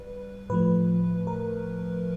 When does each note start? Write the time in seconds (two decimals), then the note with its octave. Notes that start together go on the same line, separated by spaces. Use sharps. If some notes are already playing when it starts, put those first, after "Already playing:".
Already playing: G3 B4
0.50 A2 F3 A3 B4
1.27 A#4